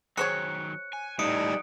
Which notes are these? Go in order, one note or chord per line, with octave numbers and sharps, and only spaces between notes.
D#3 F#3 G#4 C5 C#5 F#6 C#7
G#5
A2 G3 D#4 D#6 C#7 D7